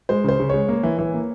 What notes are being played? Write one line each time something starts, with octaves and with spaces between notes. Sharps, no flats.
G#3 C5
C#3 C5
C#3
G#3 C#5
A#3
E3
E3
A#3